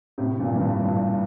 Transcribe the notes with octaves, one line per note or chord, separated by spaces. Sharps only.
A2 C3
G2 A#2
G2
A2
G2 A#2